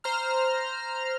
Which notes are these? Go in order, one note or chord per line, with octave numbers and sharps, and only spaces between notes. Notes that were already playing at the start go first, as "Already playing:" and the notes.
C5 A#5 F6